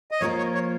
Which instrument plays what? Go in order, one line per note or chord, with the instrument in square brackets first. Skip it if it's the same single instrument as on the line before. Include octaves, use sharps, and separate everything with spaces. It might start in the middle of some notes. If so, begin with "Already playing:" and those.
[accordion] D#5
[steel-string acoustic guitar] F3 A#3 F4 A#4 [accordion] C#5
[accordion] C#5
C#5